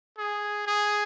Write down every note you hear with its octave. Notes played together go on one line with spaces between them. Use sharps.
G#4
G#4